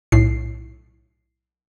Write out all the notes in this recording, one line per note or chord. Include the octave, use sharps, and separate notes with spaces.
B1 A2 C7